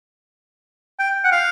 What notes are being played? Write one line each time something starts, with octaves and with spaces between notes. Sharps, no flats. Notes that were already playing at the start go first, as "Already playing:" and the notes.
G5
F#5
F5